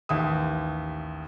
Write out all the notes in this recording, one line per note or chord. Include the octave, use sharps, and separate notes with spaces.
A1 D#2 E5 D#6